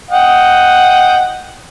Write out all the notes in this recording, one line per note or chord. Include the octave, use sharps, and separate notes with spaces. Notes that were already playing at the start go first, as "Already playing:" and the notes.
D#5 F#5 G5